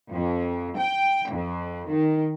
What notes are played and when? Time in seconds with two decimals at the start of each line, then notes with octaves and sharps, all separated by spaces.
0.12 F2
0.78 G5
1.31 F2
1.90 D#3